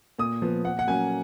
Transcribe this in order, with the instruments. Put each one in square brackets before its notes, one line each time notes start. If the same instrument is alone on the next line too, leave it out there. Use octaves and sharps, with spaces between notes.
[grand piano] A#2 D#6
F3 B3
A#2 F#5
F#5
F#3 A#3 C#4 G#5